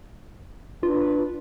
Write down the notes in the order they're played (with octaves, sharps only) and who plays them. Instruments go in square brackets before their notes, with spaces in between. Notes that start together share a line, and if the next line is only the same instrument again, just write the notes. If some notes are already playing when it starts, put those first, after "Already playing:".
[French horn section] D4 B4 [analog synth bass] F4